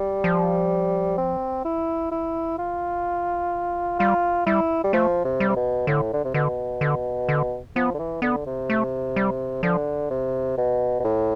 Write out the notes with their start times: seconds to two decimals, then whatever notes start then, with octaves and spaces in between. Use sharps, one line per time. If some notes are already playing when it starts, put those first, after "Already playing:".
Already playing: G3
0.24 F3
1.18 C4
1.65 E4
2.11 E4
2.59 F4
3.99 G3 F4
4.46 G3 E4
4.84 G3
4.93 F3 A3
5.25 C3
5.40 G3
5.49 C3
5.56 B2
5.87 A2 D3
6.13 D3
6.24 C3
6.34 B2 D3
6.81 D3
7.29 D3
7.76 F3 B3
7.94 D3
7.99 E3
8.22 D3 B3
8.46 C3
8.70 A3
9.16 G3
9.63 D3 F3
10.11 C3
10.58 B2
11.00 B2
11.04 A2